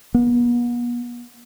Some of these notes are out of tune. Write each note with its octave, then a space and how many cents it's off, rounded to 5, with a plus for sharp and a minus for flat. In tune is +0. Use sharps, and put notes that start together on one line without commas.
B3 -40